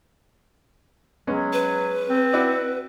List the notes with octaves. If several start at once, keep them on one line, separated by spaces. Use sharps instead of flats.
F#3 G#3 B3 C#4
B4
C4
E4 F#4 D5